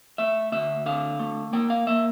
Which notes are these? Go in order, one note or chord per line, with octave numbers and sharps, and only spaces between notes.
A3 E5
D2 E5
D3 F5
A3
A#3 G5
F5
A#3 E5